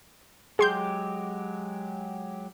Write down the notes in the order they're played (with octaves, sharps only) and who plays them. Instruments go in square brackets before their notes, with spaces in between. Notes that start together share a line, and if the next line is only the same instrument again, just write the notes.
[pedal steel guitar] F#3 G#3 G4 [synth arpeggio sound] G#4 C6 G6